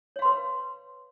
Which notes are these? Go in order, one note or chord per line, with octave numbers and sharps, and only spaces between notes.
B4 C#5 F5 C6